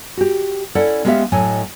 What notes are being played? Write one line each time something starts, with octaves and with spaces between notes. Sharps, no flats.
F#4 G4
C#4 E4 A4 D5 F#5
G#3 B3 C#4 G4 E5 F5
A2 F#3 D#5 G#5